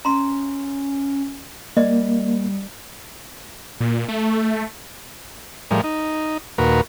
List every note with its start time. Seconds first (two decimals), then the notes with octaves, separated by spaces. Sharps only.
0.05 C#4 A#5 C6
1.77 G3 A#3 D5 D#5
3.80 A#2
4.09 A3
5.71 A2 F3 G3 G#3 A#4
5.84 D#4
6.58 D#2 A#2 F#4 A#4 B4